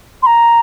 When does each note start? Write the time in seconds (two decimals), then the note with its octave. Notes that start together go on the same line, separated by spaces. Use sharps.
0.22 C6
0.26 A#5